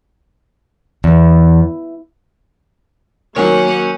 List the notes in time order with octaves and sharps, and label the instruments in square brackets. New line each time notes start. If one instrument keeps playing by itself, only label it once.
[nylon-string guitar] E2
[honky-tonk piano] D#3 F#3 [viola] A#3 F#5 [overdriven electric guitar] C#5 G#5